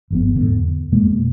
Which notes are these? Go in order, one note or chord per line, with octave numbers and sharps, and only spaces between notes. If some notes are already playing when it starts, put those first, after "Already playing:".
G1 F2 B3
G#2 D3 B3
E2
F2 B2 G#3 A#3